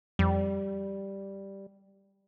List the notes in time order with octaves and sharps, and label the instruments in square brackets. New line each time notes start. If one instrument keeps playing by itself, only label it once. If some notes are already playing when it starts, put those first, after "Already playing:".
[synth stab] F2 [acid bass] G3